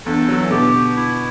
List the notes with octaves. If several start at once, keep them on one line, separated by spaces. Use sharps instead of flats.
E2 G2 A4
F#3
E3
B2 D3 G4
E4